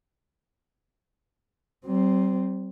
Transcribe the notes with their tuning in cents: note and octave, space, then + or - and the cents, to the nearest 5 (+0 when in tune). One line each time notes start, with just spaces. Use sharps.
G3 -45 C4 +0